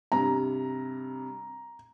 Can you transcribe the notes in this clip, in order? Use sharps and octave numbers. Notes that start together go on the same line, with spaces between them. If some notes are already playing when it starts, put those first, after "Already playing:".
G2 C3 A#5